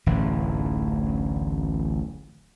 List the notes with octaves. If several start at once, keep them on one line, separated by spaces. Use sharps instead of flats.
D1 A1 F#2 E3